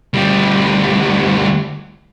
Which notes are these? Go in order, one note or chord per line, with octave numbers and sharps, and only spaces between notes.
D2 G3